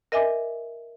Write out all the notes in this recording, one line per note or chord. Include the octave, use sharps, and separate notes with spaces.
A#4 D#5 E5 G#5 D6